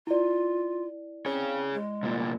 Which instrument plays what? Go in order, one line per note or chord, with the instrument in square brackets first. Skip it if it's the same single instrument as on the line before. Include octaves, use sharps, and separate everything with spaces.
[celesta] E4 D5 [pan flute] F4
[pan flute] C4 [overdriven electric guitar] G#4 C#5
[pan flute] G#3
[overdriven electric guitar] C2 A#2